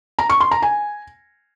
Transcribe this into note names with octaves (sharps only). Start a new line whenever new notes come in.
A#5
C#6
C6
A#5
G#5